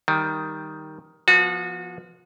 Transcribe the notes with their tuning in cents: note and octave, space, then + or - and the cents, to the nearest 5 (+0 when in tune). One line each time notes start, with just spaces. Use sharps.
D#3 +5 G3 +0
F3 +0 B3 -15 F#4 -30